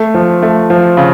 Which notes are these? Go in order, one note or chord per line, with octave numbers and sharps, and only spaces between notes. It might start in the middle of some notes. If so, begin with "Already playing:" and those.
Already playing: A3
F3
A3
F3
C#3